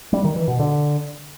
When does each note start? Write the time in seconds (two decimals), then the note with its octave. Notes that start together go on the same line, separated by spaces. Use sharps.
0.13 G3
0.24 D#3
0.36 E3
0.48 B2
0.60 D3